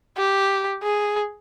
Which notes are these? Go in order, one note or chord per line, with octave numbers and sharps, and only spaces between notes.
G4
G#4